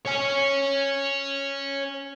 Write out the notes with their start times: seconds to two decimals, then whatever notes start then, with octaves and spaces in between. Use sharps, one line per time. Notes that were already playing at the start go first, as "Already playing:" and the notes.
0.06 C#5 G#5